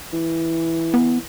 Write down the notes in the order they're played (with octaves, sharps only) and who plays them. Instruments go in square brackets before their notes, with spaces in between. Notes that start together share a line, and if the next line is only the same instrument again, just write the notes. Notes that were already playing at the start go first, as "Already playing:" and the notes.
[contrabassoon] E3
[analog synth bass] B3